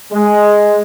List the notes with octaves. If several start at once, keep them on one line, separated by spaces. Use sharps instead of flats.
G#3